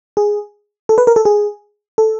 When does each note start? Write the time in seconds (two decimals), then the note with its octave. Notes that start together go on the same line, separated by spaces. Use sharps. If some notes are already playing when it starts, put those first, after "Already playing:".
0.17 G#4
0.89 A4
0.98 B4
1.07 A#4
1.16 A4
1.25 G#4
1.98 A4